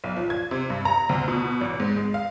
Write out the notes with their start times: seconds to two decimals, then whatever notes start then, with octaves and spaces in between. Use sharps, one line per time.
0.04 B1
0.16 F3
0.30 G#6
0.51 C3
0.70 G2
0.85 A#5
1.09 D2
1.28 B2
1.61 A1
1.80 G#2
1.97 G#3
2.14 F5